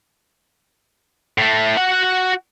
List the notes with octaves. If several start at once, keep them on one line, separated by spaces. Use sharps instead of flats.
A2 A3
F#4 F#5